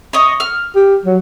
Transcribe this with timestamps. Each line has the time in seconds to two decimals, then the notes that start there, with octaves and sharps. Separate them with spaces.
0.13 C#5 D#5
0.40 F6
0.76 G4
1.06 F#3